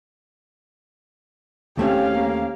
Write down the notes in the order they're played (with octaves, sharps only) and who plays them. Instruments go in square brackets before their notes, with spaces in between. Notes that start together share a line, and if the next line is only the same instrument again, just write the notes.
[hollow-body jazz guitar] D#2 A3 C4 [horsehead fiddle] C#4 F5 [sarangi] G4
[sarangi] A#3